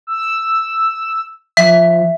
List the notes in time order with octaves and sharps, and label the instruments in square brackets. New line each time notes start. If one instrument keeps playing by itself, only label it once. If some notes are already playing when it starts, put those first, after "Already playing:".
[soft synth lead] E6
[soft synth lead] F3 [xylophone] E5 B6